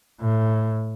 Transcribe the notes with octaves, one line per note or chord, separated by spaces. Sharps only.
A2